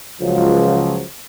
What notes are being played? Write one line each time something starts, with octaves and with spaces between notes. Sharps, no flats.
C#2 F3 F#3